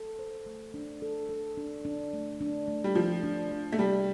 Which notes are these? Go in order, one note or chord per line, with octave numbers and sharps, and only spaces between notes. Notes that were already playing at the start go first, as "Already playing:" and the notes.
Already playing: A4
C5
A3
D4
A4
A4
D4
D4
A3
D4
A3
G3
F3 A3
D4
D4
A3
C3 G3